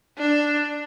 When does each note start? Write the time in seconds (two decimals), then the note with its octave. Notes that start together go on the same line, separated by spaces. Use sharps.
0.18 D4